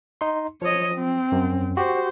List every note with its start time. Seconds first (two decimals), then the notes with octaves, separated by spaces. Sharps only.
0.21 D#4 C6
0.62 F3 C#5 D#5
0.95 C4
1.32 F#2
1.77 F#4 G4 C5